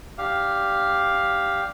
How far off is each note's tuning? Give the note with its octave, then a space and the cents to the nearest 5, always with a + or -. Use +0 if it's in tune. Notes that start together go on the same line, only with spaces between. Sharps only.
D4 +0 G4 +0 F5 +0